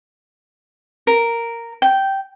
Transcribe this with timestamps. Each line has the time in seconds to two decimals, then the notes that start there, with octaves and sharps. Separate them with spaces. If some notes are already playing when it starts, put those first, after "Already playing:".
1.07 A#4
1.82 G5